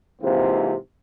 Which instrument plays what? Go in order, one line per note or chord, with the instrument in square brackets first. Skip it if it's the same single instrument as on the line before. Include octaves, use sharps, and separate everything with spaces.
[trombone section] G#2 C3 E3 A#3 C4 F4